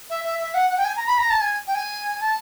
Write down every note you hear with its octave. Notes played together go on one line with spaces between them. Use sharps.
E5
E5
E5
F#5
F#5
G5
G#5
A#5
B5
A#5
A5
G#5
G5
G#5
A5